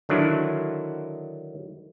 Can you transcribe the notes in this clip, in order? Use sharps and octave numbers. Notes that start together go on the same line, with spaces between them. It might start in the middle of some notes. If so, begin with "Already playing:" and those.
D3 D#3 F#3 D4 E4